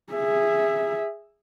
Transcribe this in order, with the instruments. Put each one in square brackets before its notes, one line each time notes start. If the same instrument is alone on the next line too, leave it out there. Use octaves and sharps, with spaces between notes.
[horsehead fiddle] G#4 E5